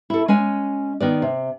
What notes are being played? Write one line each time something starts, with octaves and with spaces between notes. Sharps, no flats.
E4 A4
G#3 C#4 G#5
D#3 B3 D5
C3